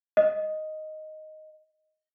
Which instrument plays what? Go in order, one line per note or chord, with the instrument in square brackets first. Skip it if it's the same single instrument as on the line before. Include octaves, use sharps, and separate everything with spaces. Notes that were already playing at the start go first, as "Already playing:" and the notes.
[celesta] D#5